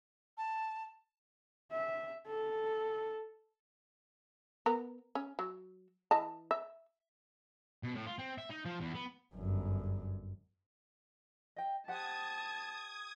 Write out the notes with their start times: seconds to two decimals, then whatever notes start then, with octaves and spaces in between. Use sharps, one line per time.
0.38 A5
1.72 E5
2.27 A4
4.66 B3 A#4
5.15 C#4
5.39 F#3
6.11 E3 D#5 A5
6.51 E5
7.83 B2
7.95 A2
8.07 F4
8.19 C4
8.38 E5
8.50 D#4
8.65 F3
8.80 E2
8.94 B3
9.35 G1 F#2
11.56 D#5 G5
11.88 G4 C5 F#5 A5 D#6 G#6